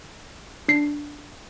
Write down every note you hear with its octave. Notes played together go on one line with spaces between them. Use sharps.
D4 C7